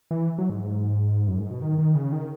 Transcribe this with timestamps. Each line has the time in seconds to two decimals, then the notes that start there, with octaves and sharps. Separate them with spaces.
0.11 E3
0.38 F#3
0.50 G#2
1.28 F#2
1.40 G#2
1.51 B2
1.62 D#3
1.79 D#3
1.95 C#3
2.12 D#3